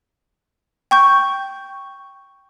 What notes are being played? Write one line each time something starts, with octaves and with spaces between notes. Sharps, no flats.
G5 C#6 G6